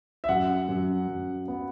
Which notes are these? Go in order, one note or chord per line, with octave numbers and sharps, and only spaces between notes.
E5
F#2 F#5
F#2
F#2
B3